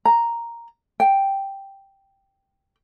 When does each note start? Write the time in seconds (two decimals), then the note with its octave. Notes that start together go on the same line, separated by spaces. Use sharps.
0.05 A#5
1.00 G5